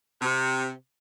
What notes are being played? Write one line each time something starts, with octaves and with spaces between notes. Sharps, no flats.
C3